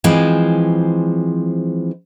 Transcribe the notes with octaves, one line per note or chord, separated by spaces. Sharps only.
E3 F3 G#3 C4